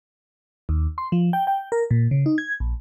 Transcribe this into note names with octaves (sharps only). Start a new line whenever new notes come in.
D#2
C6
F3
G5
G5
A#4
A#2
C#3
D#4
G#6
A#1